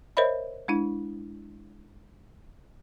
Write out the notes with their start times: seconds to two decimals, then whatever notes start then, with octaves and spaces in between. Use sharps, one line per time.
0.17 A#4 C5 C#5 D#5 E5 B5
0.68 G#3 D4 E4